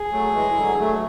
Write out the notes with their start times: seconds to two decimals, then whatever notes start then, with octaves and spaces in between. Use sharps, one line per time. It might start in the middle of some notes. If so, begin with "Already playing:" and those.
Already playing: G#4
0.12 F#3 A3
0.34 E3 G#3
0.57 D3 F#3
0.79 F#3 A3